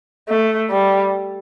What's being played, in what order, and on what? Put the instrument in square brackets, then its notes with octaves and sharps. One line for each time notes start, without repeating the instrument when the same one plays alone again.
[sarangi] A3
G3